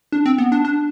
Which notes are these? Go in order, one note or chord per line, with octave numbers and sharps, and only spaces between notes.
D4
C4
B3
D4
D4